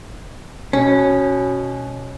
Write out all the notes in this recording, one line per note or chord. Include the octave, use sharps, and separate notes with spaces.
B2 C#4